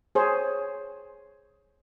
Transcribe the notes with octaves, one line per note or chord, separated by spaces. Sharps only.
G#4 C5 C#5